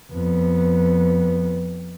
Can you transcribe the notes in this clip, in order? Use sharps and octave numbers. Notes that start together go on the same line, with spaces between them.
F2 B3